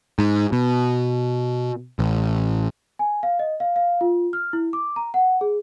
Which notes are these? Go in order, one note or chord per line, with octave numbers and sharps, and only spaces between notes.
G#2
B2
A1
G#5
F5
D#5
F5
F5
F4
F6
E4
D6
A#5
F#5
G#4